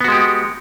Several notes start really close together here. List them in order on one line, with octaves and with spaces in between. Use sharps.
B3 F#4 G#3 G4